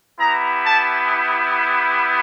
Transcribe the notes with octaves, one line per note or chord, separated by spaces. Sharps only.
B3 E4 G4 A#5
A5